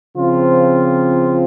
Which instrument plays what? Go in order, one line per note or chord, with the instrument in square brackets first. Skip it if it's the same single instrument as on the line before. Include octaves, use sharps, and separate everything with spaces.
[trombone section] C#3 F3 C4 F4